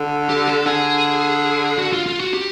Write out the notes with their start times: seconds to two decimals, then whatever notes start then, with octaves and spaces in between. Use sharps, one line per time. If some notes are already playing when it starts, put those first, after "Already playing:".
Already playing: D3
0.29 G4
0.48 A4
0.66 D3 G#4
1.78 F#4
1.93 F4
2.06 F4
2.20 F#4
2.34 G4